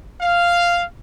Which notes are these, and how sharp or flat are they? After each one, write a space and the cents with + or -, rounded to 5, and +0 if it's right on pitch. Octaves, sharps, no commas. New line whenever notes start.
F5 -5